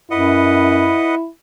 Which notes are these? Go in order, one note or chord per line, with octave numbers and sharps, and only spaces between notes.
F#2 E4 B4 D#5 F#5